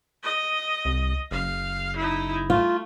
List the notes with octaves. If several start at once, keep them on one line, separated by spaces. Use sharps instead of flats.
D#5
C2
F#1 F5
D#4 E4
A3 F4